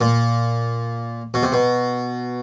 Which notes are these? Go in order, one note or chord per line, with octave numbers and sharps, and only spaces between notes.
A#2
B2
C3
B2